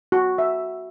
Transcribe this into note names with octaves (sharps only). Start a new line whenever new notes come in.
F#4
E5